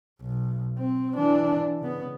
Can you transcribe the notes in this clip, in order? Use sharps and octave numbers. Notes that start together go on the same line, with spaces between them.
B1
C4
E3 D4
C#3 B3